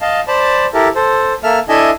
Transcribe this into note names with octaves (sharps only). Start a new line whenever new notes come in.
D#5 F5 A5
C5 D5 A5 B5
E4 G4 A4 A#4
A4 C5
A#3 A4 E5 F6
D4 E4 A4 D#5 E5 G#5